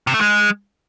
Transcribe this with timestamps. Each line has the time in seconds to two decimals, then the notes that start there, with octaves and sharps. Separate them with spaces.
0.07 C3
0.14 A3
0.21 G#3